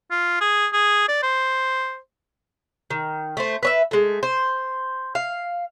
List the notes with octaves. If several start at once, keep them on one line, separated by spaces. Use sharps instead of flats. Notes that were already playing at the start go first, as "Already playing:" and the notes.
F4
G#4
G#4
D5
C5
D#3
A3 C5
B4 C#5 E5
G#3 A3
C5
F5